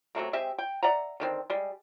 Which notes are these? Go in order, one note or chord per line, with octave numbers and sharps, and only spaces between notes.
C3 F#3 A3 A#3
G#3 C4 G4 E5
G5
D5 E5 F#5 A#5
D3 D#3 C4
G3 G#3